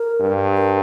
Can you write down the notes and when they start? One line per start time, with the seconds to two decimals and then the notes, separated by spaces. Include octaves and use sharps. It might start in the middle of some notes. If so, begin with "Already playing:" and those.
Already playing: A#4
0.20 G2
0.57 A#4